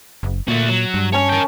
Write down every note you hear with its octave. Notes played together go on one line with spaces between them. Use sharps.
F#1
A#2 A3 F#4
F#3
G2
C#4 C#5 A5
A#4 G5